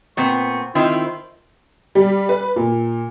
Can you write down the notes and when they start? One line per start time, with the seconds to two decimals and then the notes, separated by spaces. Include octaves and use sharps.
0.17 A#2 B3 C4 C#6
0.75 D#3 C4 E4 F4
1.95 G3
2.29 B4
2.56 A#2